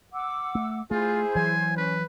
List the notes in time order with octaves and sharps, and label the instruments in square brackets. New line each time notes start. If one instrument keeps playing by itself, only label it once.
[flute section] F#5 D6 E6
[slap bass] A3
[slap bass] A3 [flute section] E4 C5 [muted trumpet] F4 [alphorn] G#4
[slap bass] E3 F#3 [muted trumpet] G#5
[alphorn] C#4 [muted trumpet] B4